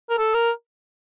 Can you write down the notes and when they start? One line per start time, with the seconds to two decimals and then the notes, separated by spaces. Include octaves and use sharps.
0.10 A#4
0.18 A4
0.34 A#4